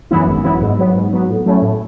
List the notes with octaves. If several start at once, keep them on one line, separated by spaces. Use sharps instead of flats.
F#2 E3 B3 E4
G#1
F#2 E3 B3 E4
G#2
F#3 B3
G#2
F#3 B3
A2
F#3 A3 C#4 E4
A2